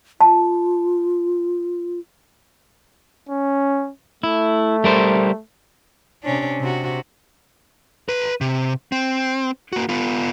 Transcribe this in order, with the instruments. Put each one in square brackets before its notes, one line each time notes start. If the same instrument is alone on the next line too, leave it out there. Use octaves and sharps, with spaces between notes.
[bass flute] F4 [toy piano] A5
[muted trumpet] C#4
[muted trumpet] A3 [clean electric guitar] E4
[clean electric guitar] G3 A#4 C5
[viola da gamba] C3 C#4 D4
C3 F#4
[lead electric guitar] B4 A#5
C3
C4
A#3 F#4
B3 F4